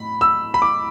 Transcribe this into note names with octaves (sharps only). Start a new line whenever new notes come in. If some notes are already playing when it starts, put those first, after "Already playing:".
Already playing: A2 B5
E6
B5
D6